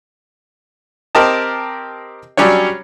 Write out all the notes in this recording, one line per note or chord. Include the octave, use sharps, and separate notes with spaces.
C4 G4 A#4 D#5 A5
F#3 G3 C#4 D4 C#5